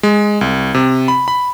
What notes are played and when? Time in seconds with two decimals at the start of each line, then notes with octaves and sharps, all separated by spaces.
0.03 G#3
0.41 C2
0.74 C3
1.08 B5
1.28 B5